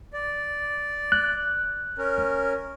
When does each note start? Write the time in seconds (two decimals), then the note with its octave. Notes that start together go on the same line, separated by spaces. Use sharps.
0.13 D5
1.12 F#6
1.98 C#4 A#4